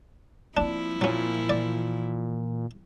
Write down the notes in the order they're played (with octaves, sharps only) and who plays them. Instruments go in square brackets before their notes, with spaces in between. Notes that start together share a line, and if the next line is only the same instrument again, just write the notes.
[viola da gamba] F3 E4 [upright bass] A#3 C4 [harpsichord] D4
[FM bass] A#2 [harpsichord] F#3 C#4
[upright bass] E3 [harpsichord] D5